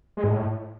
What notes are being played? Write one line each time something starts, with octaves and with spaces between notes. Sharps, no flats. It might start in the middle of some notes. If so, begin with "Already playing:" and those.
G#3
G#2
A2